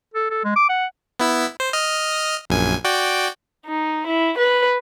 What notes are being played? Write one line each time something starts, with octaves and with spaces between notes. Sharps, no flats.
A4
A4
G#3
D6
F#5
B3 E4 E6
C5
D#5 D#6 F6
A#1 F#2 G#5
F#4 D5 G5
D#4
E4
B4